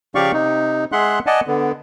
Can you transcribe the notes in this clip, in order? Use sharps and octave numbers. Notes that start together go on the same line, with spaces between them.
C#3 F3 G4 D5 F5 C#6
C3 D#4
G#3 G#4 E5 F#5 C6 F#6
D5 D#5 F#5 G#5 A5
D3 B3